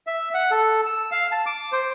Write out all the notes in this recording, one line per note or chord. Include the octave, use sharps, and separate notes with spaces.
E5
F#5
A4
E6
F5
A5
D6
C5